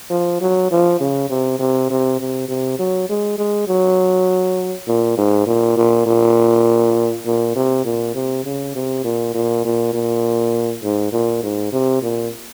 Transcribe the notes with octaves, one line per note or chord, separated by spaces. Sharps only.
F3
F#3
F3
C#3
C3
C3
C3
C3
C3
F#3
G#3
G#3
F#3
A#2
G#2
A#2
A#2
A#2
A#2
C3
A#2
C3
C#3
C3
A#2
A#2
A#2
A#2
G#2
A#2
G#2
C3
A#2